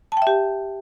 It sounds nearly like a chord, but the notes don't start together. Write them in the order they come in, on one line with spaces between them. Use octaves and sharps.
A5 G5 E5 G4